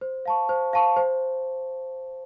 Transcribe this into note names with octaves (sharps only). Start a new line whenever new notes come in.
C5
F5 A5 C#6
C5
F5 A5 C#6
C5